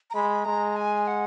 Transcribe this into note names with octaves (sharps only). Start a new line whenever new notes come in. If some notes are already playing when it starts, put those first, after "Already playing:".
A#5
G#3 B5
G#3 A#5
G#5
F#5